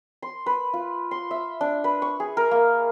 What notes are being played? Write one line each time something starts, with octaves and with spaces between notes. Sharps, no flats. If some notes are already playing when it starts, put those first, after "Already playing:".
C6
B4
F4
C6
E5
D4
B4
C#6
G#4
A#4
A#3